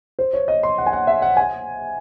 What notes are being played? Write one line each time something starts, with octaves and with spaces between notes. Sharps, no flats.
C5
C#5
D#5
C6
F#5
G#5
F#5
E5
F#5
G#5